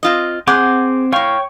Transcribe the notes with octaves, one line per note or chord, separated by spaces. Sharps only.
C4 F4 D#5
C4 G#4 F#5 D6 G6
A2 C#5 F5 G5 C#6